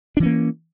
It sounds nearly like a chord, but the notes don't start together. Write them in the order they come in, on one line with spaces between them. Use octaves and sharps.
D4 E3 C#4 A#3